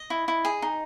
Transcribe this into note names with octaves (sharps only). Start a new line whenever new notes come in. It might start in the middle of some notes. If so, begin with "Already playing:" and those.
Already playing: D#5
E4
E4
G#4
D#4